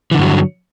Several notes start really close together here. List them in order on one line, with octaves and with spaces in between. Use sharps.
E3 D3 G2 F#3